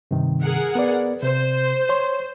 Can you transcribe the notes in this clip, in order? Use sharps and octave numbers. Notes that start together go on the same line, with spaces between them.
G2 C3 D#3
G#4 A#4 F#5
B3 B4 D5
C3 C5
C#5 C6